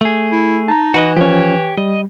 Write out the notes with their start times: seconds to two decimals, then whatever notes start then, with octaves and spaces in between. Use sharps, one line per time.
0.01 A3 G#4
0.32 E4
0.68 D#4 A5 A#5
0.94 E3 D#4 F#4 B4 D#5
1.17 F3 C#4 G4 C#5
1.78 G3 D#5